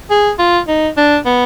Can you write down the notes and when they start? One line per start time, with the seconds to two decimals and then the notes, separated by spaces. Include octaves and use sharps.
0.11 G#4
0.39 F4
0.68 D#4
0.97 D4
1.26 B3